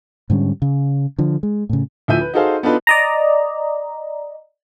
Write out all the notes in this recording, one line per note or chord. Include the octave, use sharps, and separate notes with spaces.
G#2 D3 G3 C#4
C#3
D3 F3
G#3
A2 C#3
D2 F3 E4 E5 G6 D#7
B4
D#4 F#4 G#4 A4 C5 F5
B3 D4 D#4 F4 A4 B4
D5 D#5 A#5